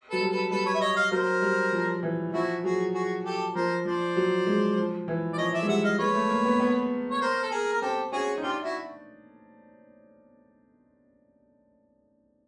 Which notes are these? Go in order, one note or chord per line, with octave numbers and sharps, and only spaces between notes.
F#3 A4 B4
G3
A4 B4
G3 A4 B4
B4 C#5
E5
C#5 D#5
D#5 F5
F#3 A#4 C5
G3
F3
E3
F3 E4 F#4
F#3 F#4 G#4
F#4 G#4
G4 A4
F3 A#4 C5
F3 C5 D5
F#3
G#3
F3
E3
D5
F3 C#5 D#5
D5 E5
G#3
G3 E5 F#5
D#5 F5
G#3 B4 C#5
A3
A#3
B3
B3
C#5
A#4 C5
A4
G#4 A#4
A#4
C4 G4 A4
C#4 F#4 G#4
D#4
D4 F4 G4
E4 F#4